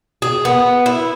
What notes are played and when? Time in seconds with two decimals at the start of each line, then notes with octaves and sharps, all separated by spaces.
0.22 G#4
0.45 B3
0.86 E4